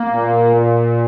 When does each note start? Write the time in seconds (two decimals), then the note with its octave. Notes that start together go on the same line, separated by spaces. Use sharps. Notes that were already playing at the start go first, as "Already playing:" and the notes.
Already playing: A#3
0.11 A#2